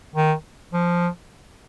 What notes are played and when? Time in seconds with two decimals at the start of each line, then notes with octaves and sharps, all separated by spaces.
0.15 D#3
0.73 F3